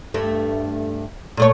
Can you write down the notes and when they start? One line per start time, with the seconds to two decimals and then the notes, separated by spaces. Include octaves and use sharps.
0.14 G2 A3
1.37 A#2 A3 C#5